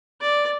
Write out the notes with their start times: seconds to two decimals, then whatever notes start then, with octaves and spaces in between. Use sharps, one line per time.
0.21 D5